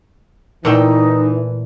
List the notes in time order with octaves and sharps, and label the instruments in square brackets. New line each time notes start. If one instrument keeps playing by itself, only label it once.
[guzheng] A#2 A3 G5 [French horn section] E3 [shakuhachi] D#4